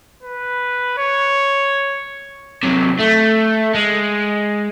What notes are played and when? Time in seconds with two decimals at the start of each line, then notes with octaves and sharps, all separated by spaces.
0.23 B4
0.98 C#5
2.63 C3 F#3
3.00 A3
3.74 G#3